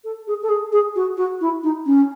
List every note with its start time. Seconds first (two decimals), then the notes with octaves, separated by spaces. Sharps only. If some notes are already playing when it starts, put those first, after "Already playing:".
0.04 A4
0.27 G#4
0.43 A4
0.49 G#4
0.72 G#4
0.96 F#4
1.17 F#4
1.41 E4
1.63 D#4
1.86 C#4